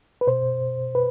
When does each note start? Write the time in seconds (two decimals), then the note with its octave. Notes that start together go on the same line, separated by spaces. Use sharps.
0.21 B4
0.27 B2 C5
0.95 B4